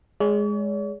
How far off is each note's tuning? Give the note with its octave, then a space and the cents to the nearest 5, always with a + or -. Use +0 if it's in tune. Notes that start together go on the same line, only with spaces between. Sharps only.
G#3 +0 C#5 +45